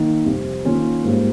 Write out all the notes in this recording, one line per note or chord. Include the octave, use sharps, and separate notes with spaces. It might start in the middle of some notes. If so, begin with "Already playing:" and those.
Already playing: D#3 A#3 D#4
F2 C3 G3
D#3 A#3 C#4 F4
G#2 G3 A#3 F4